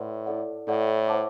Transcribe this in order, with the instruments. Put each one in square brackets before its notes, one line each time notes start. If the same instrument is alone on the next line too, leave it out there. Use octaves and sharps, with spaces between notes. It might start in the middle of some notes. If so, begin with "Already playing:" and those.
Already playing: [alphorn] A2 [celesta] B4 D5 F#5 C6
[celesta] E4 A4 D5 F#5
[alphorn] A2 [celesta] E4 A4 D5 F#5
[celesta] C5 F#5 A5 D6